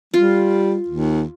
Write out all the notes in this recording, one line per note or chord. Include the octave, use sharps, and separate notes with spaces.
G3 F4
D#2